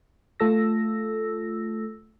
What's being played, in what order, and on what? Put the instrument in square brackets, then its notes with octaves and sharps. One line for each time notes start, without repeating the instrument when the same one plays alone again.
[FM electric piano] A3 F4 A4 E6 A#6